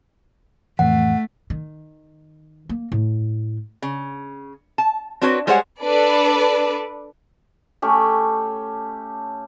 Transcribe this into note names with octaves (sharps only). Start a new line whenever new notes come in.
F2 A2 E3 A3 F#5
D#3
A#3
A2
C#3
A5
C4 D4 F#4 B4 C#5
G3 G#3 G#4 C5 C#5 F#5
D4 A4 B4 D5
A3 C#4 G4